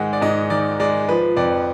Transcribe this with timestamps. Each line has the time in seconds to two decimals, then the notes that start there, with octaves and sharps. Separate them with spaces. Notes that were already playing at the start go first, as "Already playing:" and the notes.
Already playing: G#2 D#3 G#3 F#5
0.13 D5
0.21 G#2 D#5
0.50 D#3 D5
0.80 G#3 D5
1.09 F3 B4
1.37 F2 D5